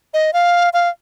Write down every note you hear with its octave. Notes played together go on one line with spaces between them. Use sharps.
D#5
F5
F5